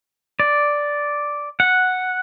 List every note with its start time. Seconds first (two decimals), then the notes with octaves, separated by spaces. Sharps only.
0.40 D5
1.60 F#5